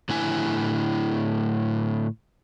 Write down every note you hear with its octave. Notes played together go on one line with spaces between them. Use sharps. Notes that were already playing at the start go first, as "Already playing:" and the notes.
A2 D3 E4 G#5